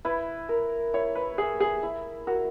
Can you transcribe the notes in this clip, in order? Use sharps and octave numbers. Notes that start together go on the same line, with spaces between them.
E4 B4
A#4
E4 C#5
B4
G#4 E5
G#4
E4
F#4 A#4